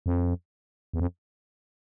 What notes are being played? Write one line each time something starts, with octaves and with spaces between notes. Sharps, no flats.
F2
E2
F2